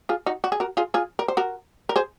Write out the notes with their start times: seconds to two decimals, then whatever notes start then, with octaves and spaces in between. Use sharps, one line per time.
0.09 F4 G#4
0.26 D#4 F#4
0.44 F#4
0.52 G#4
0.60 F#4 A#4
0.77 F4 G#4
0.94 F4 G#4
1.19 A#4
1.28 C5
1.37 F#4 A#4
1.89 A#4
1.96 G#4 C5